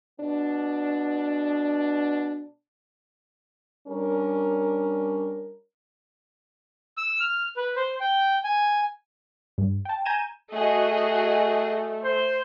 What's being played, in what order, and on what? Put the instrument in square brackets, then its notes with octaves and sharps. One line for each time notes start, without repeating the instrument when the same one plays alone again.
[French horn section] B2 B3 D4
G3 C#4 D4 A#4
[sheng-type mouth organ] E6
F6
B4
C5
G5
G#5
[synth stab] G2
G5 A5
G#5 A#5 G6 G#6 D#7 E7
[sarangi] A3 [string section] F#4 G#4 D#5
[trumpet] C5